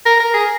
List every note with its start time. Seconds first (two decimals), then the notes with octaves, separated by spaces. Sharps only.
0.06 A#4
0.20 A#4
0.34 G#4